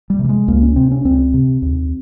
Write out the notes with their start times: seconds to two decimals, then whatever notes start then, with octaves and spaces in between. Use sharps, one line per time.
0.10 G3
0.19 C3
0.24 G3
0.29 G#3
0.48 C#2 A#3
0.63 C#4
0.76 C3 C4
0.91 C#4
1.04 C#2 C4
1.34 C3
1.62 D#2